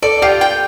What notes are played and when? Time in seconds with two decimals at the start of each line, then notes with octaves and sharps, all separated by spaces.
0.02 A4 D5
0.22 F4 G4
0.41 G5